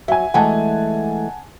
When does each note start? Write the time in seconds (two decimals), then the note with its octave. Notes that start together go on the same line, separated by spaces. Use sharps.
0.08 F#3 E5 G#5
0.34 E3 G#3 A3 F#5 G#5 A5